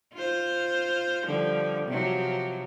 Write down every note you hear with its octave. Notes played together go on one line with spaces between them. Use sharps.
F4 C5
D3 F3 G3
C3 F3 F#3